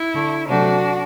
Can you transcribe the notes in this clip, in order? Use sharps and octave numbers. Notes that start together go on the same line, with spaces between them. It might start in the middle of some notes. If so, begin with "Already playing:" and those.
Already playing: E4
D3 A3
C3 F#3 A3 D4 F#4